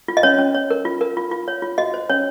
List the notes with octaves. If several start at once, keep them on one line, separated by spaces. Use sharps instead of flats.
F4
D#5
C#4 C#5
C#4
C#5
A#4
F4
A#4
F4
F4
C#5
F4
F#4 D#5
C5
C#4 C#5